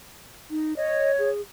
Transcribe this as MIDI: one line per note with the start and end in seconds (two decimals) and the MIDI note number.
0.50 0.73 63
0.77 1.30 73
0.77 1.11 75
1.19 1.41 68